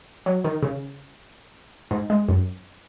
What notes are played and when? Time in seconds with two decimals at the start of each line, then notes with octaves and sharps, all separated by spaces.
0.26 F#3
0.44 D#3
0.62 C#3
1.91 G#2
2.10 G#3
2.29 F#2